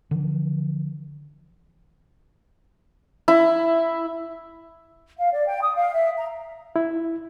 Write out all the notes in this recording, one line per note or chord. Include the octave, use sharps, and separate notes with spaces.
D3 E3 F3
E4
F5
D5
G5
D#6
F5
E5
A#5
E4